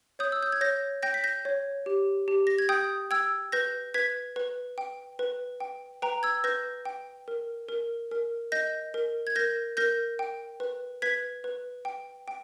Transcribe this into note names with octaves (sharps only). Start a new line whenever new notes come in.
C#5 D#6 G6
E6
G6
G#6
C#5 G6 A#6
G5 G6 A#6
B6
G6 A#6
C#5
G4
G4
A#6
G#6
G5 D#6 G6
G5 E6 G#6
B4 G6 A#6
B4 G#6 B6
B4
G5
B4
G5
B4 G5 A#5
E6 G#6
B4 G6 A#6
G5
A#4
A#4
A#4
D#5 G6 A#6
A#4
G#6
A#4 G6 A#6
A#4 G6 A#6
G5
B4
B4 G#6 B6
B4
G5
G5